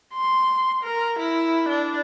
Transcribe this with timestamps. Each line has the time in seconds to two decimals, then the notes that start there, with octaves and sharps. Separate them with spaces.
0.14 C6
0.84 A#4
1.19 E4
1.69 D4